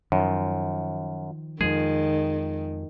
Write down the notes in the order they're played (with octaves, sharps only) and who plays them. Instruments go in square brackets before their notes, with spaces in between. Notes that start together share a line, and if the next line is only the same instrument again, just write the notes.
[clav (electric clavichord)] F#2 [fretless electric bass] D#3 F3
[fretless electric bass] F2 F3 G#3 [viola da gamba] D#3 [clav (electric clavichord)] G#4